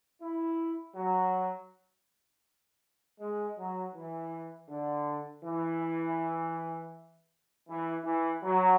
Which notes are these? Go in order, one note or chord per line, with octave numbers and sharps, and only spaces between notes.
E4
F#3
G#3
F#3
E3
D3
E3
E3
E3
F#3